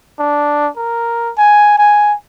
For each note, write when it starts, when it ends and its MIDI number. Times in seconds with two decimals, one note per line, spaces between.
0.19 0.69 62
0.77 1.32 70
1.38 1.76 80
1.78 2.15 80